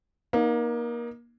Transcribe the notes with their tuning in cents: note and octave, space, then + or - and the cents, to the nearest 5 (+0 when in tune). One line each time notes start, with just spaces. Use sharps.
A#3 +25 D#4 +0